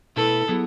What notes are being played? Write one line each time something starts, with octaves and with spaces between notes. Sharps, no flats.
B2 A3 E4 A4 B4
F#3 B3 E4 G#4